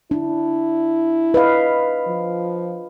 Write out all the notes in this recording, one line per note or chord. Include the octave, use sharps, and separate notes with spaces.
D4 E4
B4 D#5 F5
F3